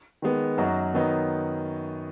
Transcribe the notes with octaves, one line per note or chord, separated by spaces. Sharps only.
D#3 G#3 B3
F#2 F#3 D#4 F#4
D#3 F#3 B3 D#4